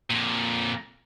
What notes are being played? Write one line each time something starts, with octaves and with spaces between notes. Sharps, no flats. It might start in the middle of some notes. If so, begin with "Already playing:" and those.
F2 A#2